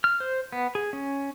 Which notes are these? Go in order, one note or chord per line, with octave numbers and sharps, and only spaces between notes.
F6
C5
B3
G#4
C#4